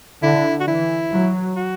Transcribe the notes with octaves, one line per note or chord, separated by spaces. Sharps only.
D3 E4
F#4
E3 E4
F#3
F#4